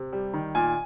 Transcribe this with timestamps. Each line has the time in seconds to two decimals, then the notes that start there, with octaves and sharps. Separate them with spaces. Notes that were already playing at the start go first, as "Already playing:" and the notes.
Already playing: C3
0.13 G3
0.33 D#3
0.55 A#2 G#5